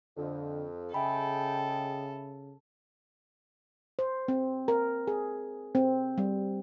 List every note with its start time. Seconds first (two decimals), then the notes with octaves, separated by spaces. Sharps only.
0.17 F2 D3
0.94 C#3 G#4 A4 D#5 E5 G5 G#5 B5
3.99 C5
4.28 C4
4.68 A#4
5.07 G#4
5.75 C4
6.18 G3